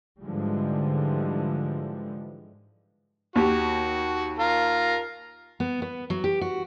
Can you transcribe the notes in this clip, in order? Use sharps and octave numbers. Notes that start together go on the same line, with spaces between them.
G#2 D3 E3 F3 G3 G#3
D#2 F#4 G4
F4 A#4
B3
B3
F#3
G4
F#4